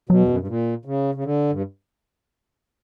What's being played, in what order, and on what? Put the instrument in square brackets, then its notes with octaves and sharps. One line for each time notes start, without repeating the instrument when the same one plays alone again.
[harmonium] B2 [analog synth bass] F#3
[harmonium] E2
F#2
G2
A#2
C#3
C#3
D3
G2